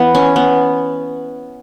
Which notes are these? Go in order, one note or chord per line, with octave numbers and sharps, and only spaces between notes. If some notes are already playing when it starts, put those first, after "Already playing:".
Already playing: E3 B3
C#4
B3